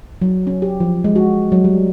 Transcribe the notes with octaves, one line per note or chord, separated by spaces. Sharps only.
F#3
C#4
G4
F3
G#3
F#4
F#3
G3